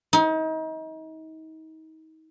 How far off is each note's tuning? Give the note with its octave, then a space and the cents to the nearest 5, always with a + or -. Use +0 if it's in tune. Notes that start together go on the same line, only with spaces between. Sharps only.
D#4 +35